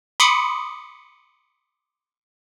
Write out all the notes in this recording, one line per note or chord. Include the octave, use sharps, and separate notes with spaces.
B5 C6 D6 D#6 C#7